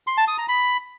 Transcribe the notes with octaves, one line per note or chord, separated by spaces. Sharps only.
C6
A5
D#6
A#5
B5